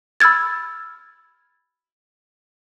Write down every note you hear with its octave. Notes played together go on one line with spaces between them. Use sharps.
B5 E6 F6 G#6 A6